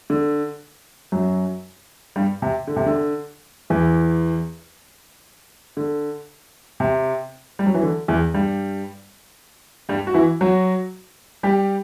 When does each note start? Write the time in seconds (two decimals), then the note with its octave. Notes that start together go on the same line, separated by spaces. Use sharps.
0.10 D3
1.12 F#2 F#3
2.16 G2 G3
2.42 C3
2.67 D3
2.76 C3
2.86 D3
3.70 E2 E3
5.77 D3
6.80 C3
7.59 G3
7.67 F#3
7.74 E3
7.83 D3
8.08 E2 E3
8.34 G2 G3
9.89 G2 G3
10.07 F#4
10.14 E3 E4
10.41 F#3 F#4
11.43 G3 G4